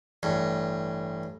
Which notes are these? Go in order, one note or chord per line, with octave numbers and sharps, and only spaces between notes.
A1 G2